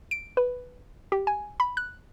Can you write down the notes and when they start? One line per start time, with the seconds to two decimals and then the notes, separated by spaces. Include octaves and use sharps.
0.11 D7
0.37 B4
1.12 G4
1.27 G#5
1.60 B5
1.77 F#6